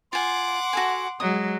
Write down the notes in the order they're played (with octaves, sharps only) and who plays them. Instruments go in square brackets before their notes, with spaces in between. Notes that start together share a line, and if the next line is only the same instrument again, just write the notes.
[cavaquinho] F4 G#5 [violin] F#5 D6 [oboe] C6
[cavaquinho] F#4 A4 G#5
[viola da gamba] F#3 G#3 [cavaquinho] D#6